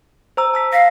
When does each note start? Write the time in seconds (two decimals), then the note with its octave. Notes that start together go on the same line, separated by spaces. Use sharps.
0.37 C5 A#5 E6
0.54 A5 E6 B6
0.73 F5 A#6 B6